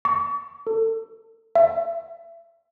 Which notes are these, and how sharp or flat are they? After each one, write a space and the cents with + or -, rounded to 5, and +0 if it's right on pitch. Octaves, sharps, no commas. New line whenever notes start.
C#6 +45
A4 +35
E5 +35